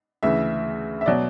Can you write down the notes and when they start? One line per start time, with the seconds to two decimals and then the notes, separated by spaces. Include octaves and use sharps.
0.23 D2 C#3 E3 E5
1.01 E5
1.06 B2 F#3 D5